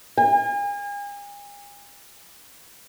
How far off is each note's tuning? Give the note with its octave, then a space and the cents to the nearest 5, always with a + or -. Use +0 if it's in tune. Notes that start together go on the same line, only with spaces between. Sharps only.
G#5 -40